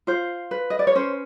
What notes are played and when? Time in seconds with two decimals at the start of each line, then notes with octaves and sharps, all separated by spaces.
0.07 F4 C5
0.51 B4
0.70 D#5
0.79 D5
0.87 C#5
0.95 C#4 C5